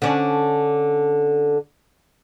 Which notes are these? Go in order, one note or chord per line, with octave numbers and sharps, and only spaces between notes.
D3 C#4 D4